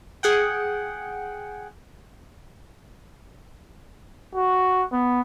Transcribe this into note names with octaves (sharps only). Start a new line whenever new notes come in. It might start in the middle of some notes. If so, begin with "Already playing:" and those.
G#4 F#5 G5
F#4
B3